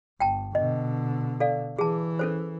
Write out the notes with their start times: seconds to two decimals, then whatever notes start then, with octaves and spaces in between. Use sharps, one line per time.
0.20 G1 G5 A5
0.55 B2 D3 D#5
1.40 A4 D5 F5
1.79 E3 G#4 A5
2.19 C#4 A4 C5